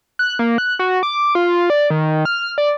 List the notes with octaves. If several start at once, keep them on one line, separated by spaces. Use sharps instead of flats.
F#6
A#3
F#6
F#4
D6
F4
D5
D#3
F6
D5